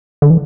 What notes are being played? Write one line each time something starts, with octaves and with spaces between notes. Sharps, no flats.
D3
E3